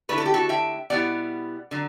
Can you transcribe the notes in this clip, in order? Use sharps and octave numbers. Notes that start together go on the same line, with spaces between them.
D3 A3 E4 B4
A4
G4
F#4 A4
E5 G5
B2 G3 B3 E4 D5 F#5
D3 F#3